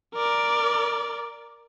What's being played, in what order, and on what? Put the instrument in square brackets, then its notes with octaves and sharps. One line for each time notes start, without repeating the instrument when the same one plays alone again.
[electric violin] A#4 D5